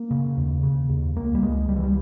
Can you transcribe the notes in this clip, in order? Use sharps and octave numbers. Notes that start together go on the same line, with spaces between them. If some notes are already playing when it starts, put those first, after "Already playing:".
Already playing: A#3
C#3
D#2
C#3
D#2
C#2 A#3
G3
C#2 G#3
C#2 G3
E3
G3